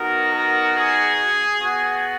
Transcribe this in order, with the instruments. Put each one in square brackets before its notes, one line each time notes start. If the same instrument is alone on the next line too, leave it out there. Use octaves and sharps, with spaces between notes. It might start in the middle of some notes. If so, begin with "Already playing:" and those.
Already playing: [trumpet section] B3 D#4 F#4 A#4
A#4
G#4
B3 F#4